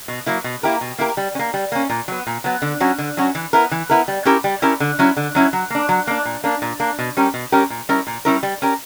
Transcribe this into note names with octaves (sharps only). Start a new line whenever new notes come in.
B2
F#3 A#3 E4
B2
A#3 E4 G4 A#4
B2
A#3 E4 G4 A#4
G3
C#4
A#3
G3
A#3 C#4
A#2
F#3 B3
A#2
F#3 B3
D3
F#3 C#4 F#4
D3
F#3 C#4 F#4
E3
B3 E4 A#4
E3
B3 E4 A#4
G3
C#4 E4 G4 A#4
G3
C#4 E4 G4 A#4
D3
F#3 C#4 E4
D3
F#3 C#4 E4
F#3
A#3 D4
F#3
A#3 D4
A#2
A#3 D4
A#2
A#3 D4
B2
G3 C#4 G4 A#4
B2
G3 C#4 G4 A#4
A#2
G3 C#4 E4 A#4
A#2
G3 C#4 E4 A#4
G3
C#4 G4 A#4